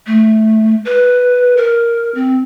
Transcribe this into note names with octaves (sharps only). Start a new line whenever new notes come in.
A3
B4
A#4
C4